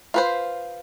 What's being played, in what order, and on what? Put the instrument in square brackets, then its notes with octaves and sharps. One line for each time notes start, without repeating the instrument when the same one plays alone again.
[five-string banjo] F4 B4 C5